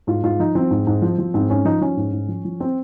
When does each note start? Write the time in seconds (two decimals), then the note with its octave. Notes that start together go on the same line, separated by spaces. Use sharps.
0.07 G#2 F4
0.23 G#2 F4
0.39 F3 D#4
0.55 F3 C4
0.71 G#2
0.87 G#2
1.02 F3
1.18 F3
1.34 G#2 C4
1.50 G#2 C#4
1.65 F3 D#4
1.81 F3 C#4
1.97 G#2
2.12 G#2
2.28 F3
2.45 F3
2.60 C4